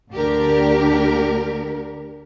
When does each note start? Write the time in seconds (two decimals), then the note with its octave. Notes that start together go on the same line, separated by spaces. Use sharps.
0.11 D2 D3 D4 G4 A#4